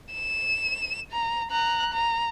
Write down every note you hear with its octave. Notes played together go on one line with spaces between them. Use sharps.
E7
A#5
A#5 F#6
A#5